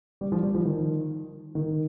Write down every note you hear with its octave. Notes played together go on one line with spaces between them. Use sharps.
G3
F3
G3
F3
D#3
D#3